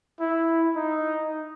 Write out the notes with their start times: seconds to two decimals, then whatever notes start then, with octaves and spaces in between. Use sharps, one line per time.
0.21 E4
0.76 D#4